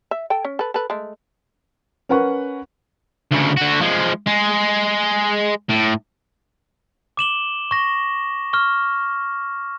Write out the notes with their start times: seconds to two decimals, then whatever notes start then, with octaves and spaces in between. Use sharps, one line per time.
0.11 E5
0.30 A4 G5
0.45 C#4
0.59 A4 B4
0.74 A4 B4
0.90 G#3 A3
2.09 C#4 A#4 B4 F#5 C#6
3.31 D2 C#3
3.57 D3 F#4
3.81 F3 G#3
4.27 G#3
5.70 A2
7.17 D6 E7 F#7 G7
7.71 C#6 A#6
8.53 C#6 F6